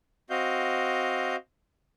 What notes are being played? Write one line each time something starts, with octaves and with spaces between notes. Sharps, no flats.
C4 F#4 D#5 F5 G6